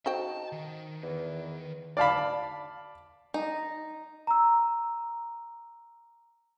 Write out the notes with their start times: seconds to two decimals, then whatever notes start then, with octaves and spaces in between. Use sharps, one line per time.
0.06 D#4 F#4 C5 G5 A5
0.52 D#3
1.03 E2
1.97 D5 F5 A5 B5
3.34 D#4
4.27 A#5 E6